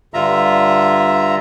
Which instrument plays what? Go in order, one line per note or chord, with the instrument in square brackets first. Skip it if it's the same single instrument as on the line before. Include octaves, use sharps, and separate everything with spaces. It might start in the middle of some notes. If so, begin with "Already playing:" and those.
[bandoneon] G2 D3 F4 E5 A#5